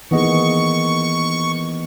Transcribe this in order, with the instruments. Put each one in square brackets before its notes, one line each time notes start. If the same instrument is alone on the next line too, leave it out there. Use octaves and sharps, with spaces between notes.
[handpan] D#3 A#3 G#4 [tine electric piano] E3 B3 D#5 [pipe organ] C#6